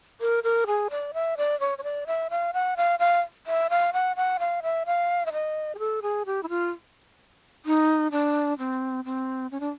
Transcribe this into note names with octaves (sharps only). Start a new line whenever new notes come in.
A#4
A#4
G#4
D5
E5
D5
C#5
C#5
D5
E5
F5
F#5
F5
F5
E5
F5
F#5
F#5
F5
E5
F5
E5
D#5
G#4
A4
G#4
G4
E4
F4
D#4
D4
C4
C4
C#4
D4